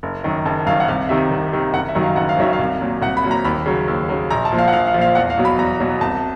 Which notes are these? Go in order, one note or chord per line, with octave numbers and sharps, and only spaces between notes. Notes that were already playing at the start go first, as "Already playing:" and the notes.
F#1
F#2 D#3
F#1 A5
F#2 D#3 F5
F#5
C2 F5
C3 D#3 E5
C2
C3 D#3
F#1 F#5
E5
F#2 D#3 F#3
F5
F#1 F#5
F5
F#2 D#3 F#3 E5
F5
C2
A#2 F#3
C2 F#5
B5
A#2 F#3
A#5
D#2 B5
C#3 F#3
D#2
C#3 F#3
A#1 A#5
A5
A#2 F3
F5
F#5
A#1 F5
F5
A#2 F3
F5
E2 F#5
F5
B2 F#3
B5
E2 A#5
B2 F#3
C2 A5